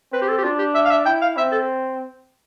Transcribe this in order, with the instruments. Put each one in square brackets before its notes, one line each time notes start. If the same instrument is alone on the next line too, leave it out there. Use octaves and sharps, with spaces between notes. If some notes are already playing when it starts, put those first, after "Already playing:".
[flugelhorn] C4 [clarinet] B4
[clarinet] G4
A4
G4
[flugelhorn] D4 [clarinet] F4
[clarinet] G4
E5
F5
E5
[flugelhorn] E4 [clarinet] G5
[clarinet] F5
[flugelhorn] C4 [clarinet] E5
[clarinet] A4